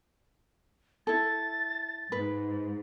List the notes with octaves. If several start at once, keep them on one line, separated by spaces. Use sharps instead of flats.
E4 A4 A6
G#2 B4